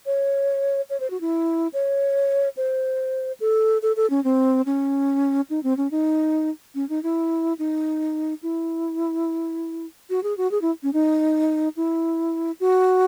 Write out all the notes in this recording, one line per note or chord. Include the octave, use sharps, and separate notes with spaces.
C#5
C#5
C5
F#4
E4
C#5
C5
A4
A4
A4
C#4
C4
C#4
D#4
C4
C#4
D#4
C#4
D#4
E4
D#4
E4
F#4
G#4
F#4
G#4
E4
C#4
D#4
E4
F#4